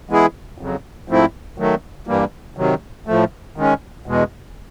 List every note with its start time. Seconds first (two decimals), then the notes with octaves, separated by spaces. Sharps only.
0.09 E3 G#3 B3 E4 G#4
0.58 F2 C#3 F#3
1.08 G#2 F3 A3 C4 E4
1.58 D#3 F#3 A3
2.07 G2 E3 G3 A#3
2.57 C3 D#3 F#3
3.07 A2 F3 A3
3.56 D#3 G#3 C#4
4.06 E2 B2 G#3